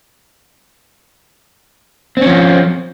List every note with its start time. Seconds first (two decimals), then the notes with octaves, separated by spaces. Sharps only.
2.17 C4
2.21 C#4
2.26 F3